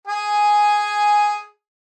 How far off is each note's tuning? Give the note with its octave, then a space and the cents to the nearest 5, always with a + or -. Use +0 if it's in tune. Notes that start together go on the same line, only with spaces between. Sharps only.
G#4 +5 G#5 +0